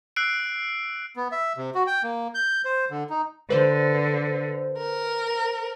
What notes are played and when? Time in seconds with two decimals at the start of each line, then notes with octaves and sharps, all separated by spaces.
0.16 E6 F#6 C7 D7
1.16 B3
1.32 E5
1.57 C3
1.75 F#4
1.87 G5
2.03 A#3
2.34 G6
2.65 C5
2.91 D3
3.10 D#4
3.50 D3 B4 C5
4.76 A#4